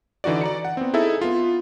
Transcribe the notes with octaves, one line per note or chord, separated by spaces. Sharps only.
D3 E3 D#4 F#4 D5
D5 A#5 C#7
F#5
B3 C4
D#4 E4 G#4 A4 E5
B3 F4